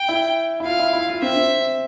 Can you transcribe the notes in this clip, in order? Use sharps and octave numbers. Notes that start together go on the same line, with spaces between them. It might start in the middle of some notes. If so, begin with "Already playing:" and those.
Already playing: G5
E4
E4
F4 F5
E4
E4
F4
C4 E5
C4